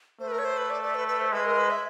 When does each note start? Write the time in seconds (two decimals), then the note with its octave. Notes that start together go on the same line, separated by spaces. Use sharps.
0.20 A3 C5
0.28 B4
0.32 A#4
0.39 C#5
0.45 C5
0.57 B4
0.70 D5
0.83 D5
0.95 B4
1.08 B4
1.20 C5
1.32 G#3 B4
1.45 A#4
1.58 B4
1.70 E5